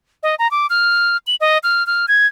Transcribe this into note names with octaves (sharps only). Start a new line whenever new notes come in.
D#5
A#5
D6
F6
F#7
D#5
F6
F6
G#6